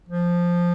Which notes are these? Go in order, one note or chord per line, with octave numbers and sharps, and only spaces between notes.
F3